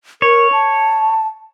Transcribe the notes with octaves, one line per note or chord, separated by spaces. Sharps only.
A#4 C#5
A5